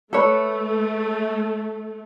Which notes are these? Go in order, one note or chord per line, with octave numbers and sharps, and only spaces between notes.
A3 A4 B4 C#5